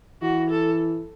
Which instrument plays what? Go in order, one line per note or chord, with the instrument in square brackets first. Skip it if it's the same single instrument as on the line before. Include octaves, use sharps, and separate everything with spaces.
[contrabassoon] E3 [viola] F#4
[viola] A4